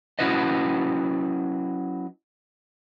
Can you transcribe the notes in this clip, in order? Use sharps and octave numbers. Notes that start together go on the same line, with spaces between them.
F#3 C#4 E4 F#4 B4 D#5